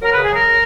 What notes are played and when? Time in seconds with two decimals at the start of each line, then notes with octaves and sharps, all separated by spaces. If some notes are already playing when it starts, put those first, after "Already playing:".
0.01 F#3 A#4
0.13 C#3 B4
0.23 G#4
0.31 F#3 A#4
0.46 C#3